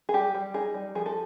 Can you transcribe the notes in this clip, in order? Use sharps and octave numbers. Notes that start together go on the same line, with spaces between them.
G#4
G3 G4
G3
D#4 G#4
G3
F3 G#4
A4